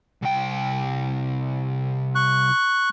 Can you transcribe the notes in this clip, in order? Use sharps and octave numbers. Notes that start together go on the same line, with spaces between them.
C2 G5
C#6 F#6